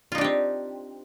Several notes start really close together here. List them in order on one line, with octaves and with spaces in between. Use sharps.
F4 D#4 D4 G4 C4